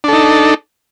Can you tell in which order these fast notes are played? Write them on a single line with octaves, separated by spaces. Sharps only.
D4 A4 D#4